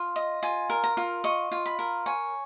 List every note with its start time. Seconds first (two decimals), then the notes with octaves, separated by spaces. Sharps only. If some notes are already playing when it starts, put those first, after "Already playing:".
Already playing: F4
0.16 D#5
0.43 F4 G#5
0.70 A#4
0.84 A#5
0.97 F4
1.24 D#5 C#6
1.52 F4
1.66 B5
1.79 A#4
2.06 C#5 G#5